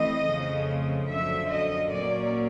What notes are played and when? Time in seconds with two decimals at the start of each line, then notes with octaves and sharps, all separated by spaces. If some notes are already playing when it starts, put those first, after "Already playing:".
Already playing: E3 A3 C4 D#5
0.27 F2 C#3 F3 A3
1.09 F#2 D3 F3 E5
1.50 D#5
1.91 A#2 F#3 A#3 C#4 D5